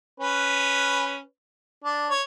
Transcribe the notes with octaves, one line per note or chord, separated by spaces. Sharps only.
C#4 B4
D4
C#5